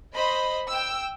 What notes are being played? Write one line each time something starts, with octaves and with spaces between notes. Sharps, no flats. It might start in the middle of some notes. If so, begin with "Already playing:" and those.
C5 D#5 B5
G5 E6